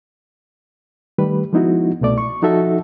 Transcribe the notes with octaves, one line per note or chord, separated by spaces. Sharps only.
D#3 G3 A3 B4
F3 G#3 B3 D#4 E4 F#4
C2 B2 A3 D5
C#6
F3 D#4 F#4 A4 E5